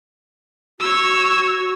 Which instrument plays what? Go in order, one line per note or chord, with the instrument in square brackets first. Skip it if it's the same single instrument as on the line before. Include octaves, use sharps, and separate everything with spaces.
[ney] F#4 [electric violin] C#5 E6